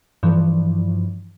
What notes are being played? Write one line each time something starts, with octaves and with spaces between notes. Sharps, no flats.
G2 E3 F3